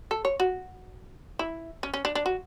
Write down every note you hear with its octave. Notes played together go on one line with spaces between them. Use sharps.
A4
C#5
F#4
E4
C#4
C#4
D4
D4
F#4